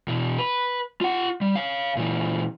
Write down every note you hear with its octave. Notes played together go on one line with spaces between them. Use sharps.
B2 E3
B4
F4 F#5
G3
C#5 F5
A#2 E3